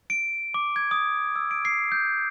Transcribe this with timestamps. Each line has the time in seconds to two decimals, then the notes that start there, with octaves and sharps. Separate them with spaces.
0.10 D7
0.54 D6
0.76 G#6
0.91 D#6
1.36 E6
1.51 D7
1.65 C7
1.92 G6